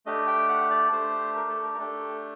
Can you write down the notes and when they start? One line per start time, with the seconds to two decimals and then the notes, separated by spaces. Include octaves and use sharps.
0.06 A3 D4 G4 D#5
0.27 G5
0.49 F#5
0.70 D5
0.92 A3 D4 G4 C5
1.36 A#4
1.49 A4
1.63 A#4
1.74 A#4
1.79 A3 D4 G4 A4